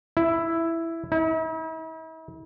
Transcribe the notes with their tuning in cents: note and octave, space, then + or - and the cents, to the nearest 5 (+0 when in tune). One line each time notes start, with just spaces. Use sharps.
E4 +5
E4 -45